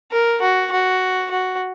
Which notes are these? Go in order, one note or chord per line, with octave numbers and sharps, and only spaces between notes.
A#4
F#4
F#4
F#4